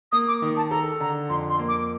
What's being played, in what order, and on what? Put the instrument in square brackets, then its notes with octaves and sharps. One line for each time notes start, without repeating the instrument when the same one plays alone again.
[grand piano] A#3 [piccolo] D#6
[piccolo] D6
[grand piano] D#3
[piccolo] A5
[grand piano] A4 [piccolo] A#5
[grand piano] D3 [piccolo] A#5
[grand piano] F2 [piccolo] C6
[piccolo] C6
[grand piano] A#3
[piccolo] D6